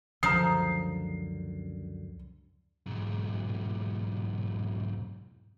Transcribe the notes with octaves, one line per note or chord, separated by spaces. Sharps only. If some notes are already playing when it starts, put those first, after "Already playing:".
C#2 F#2 D3 F3 A#5 D#6 C7
B1 G#2